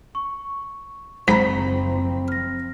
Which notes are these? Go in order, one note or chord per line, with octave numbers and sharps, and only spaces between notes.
C#6
F#1 G#2 F3 C4 A#5 B5 B6
F6 A#6